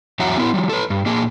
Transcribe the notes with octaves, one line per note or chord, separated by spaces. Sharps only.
E2 F#3 E5 F#5 A#5
B3 E4 A#4
F3 G3
A4 B4
G2
A#2 A#3 G#4